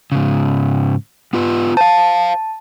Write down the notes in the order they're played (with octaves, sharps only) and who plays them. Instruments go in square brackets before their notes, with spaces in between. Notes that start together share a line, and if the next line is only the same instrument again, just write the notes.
[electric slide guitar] G#2 C#3
B3 F4 B4
[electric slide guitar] C5 F5 [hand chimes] A5